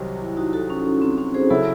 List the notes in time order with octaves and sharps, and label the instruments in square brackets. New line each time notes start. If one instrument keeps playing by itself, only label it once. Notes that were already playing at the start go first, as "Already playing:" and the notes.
Already playing: [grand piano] C2 C3 D#3 F#3 C4
[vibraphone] E4
D#4 F#4
F#4 A4
C#4
C#4
C4
C#4
G#4 C5
[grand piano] C#3 F#3 C#4 E4 [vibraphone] F#4 A4